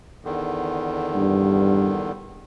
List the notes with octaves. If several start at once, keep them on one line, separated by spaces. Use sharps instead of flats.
E2 D3 D#3
G2